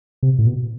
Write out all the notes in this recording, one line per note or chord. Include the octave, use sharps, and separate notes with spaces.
C3
A2
B2